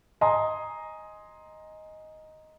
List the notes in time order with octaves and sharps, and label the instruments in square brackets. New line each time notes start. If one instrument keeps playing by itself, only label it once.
[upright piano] D#5 G#5 A#5 C6 D#6